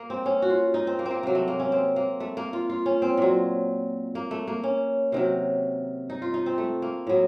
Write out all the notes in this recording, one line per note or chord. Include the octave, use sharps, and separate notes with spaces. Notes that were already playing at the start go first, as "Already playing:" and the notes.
Already playing: A#3
C4
C#4
F#4
F4
D#4
C4
A#3
C4
A#3
C3 F#3 A#3
A3
A#3
C#4
C4
A#3
A3
A#3
F4
F4
C#4
C4
A#2 F#3
A#3
A3
A#3
C#4
C3 D#3 F#3
D#4
F4
D#4
C4
A3
A#3
A2 F#3